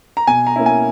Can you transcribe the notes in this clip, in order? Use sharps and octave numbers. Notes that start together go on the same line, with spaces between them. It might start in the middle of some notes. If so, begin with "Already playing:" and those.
A#5
B2 G#5
A#5
A#3 C#4 E4
G#5